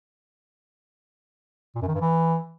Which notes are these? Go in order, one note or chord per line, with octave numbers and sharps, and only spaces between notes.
A#2
F#2
D#3
G2
E3